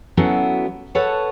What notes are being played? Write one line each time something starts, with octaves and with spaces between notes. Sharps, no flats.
F#3 B3 C#4 E4 F#4 A4
A4 B4 C#5 F#5 A5